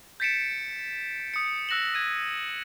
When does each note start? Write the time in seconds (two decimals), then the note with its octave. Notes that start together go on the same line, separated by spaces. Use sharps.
0.20 G6 A6 B6 C#7 D7 E7
1.34 D#6 C#7
1.69 E6 F#6 A#6 E7 F#7
1.95 G#6 D#7